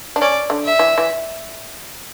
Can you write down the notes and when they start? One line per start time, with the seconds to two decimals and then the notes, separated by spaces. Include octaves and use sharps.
0.16 D4
0.21 C#4 D5
0.50 D3
0.65 E5
0.79 E3
0.98 E3